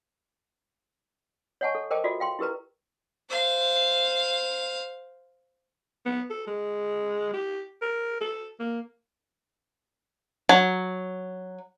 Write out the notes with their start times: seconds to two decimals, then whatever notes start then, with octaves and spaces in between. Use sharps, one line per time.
1.61 C#5 D#5 F#5 G#5 A5 C#6
1.75 A4
1.91 A#4 C5 D#5 G5 A5 D6
2.04 F4 F#4 A4 D5 E5
2.20 F5 G5 C6
2.39 E4 G4 A#4 B4 A#5
3.30 C5 F5
6.06 B3
6.30 A4
6.47 G#3
7.34 G4
7.82 A#4
8.21 A4
8.60 A#3
10.49 F#3